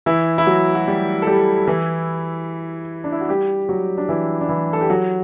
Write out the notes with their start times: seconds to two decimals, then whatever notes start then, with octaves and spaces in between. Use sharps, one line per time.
0.06 E3 E4
0.38 E4
0.47 F#3 F#4
0.75 F#4
0.88 G3 G4
1.22 A4
1.27 G3 G4
1.67 E3 E4
3.04 D4
3.12 E4
3.21 F#4
3.29 G3 G4
3.69 F#3 F#4
3.98 D4
4.09 E3 E4
4.41 D4
4.49 E3 E4
4.73 A4
4.81 G4
4.90 F#3 F#4